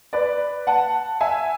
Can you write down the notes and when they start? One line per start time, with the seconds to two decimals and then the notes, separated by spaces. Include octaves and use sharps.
0.13 B4 D5
0.67 F#5 A5
1.20 E5 G#5